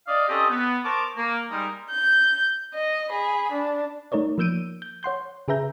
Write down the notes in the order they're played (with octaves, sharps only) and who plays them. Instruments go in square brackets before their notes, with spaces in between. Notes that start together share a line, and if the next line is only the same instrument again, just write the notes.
[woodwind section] D5 D#5 F5
C4 C#4 G4 A4 D#5
B3
A#4 C5 A5 C#6 D6
A#3
G3 G#3 D#4 A#4
[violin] G6
D#5
G#4 B5
D4
[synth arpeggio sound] A3 D#4 A#4 C#5 D5
F3 A#3 E6 G6 D7 D#7
G6
C#5 F#5 C6 G6
C#3 G#4 B4 E5 A#5 G6